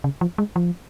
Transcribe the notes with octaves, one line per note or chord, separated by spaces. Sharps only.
C#3
F3
G#3
F3